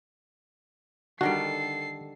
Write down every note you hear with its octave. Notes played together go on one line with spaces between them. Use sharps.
D3 D#3 G3 F#4 A4 C7